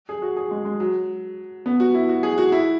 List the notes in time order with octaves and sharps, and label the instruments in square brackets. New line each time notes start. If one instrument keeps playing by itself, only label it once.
[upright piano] G#4
F#4
G#4
G#3
G#3
F#3
B3
F#4
E4
F#4
G#4
F#4
E4